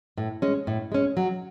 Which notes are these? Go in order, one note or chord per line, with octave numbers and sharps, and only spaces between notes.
A2
G#3 C#4
A2
G#3 C#4
F#3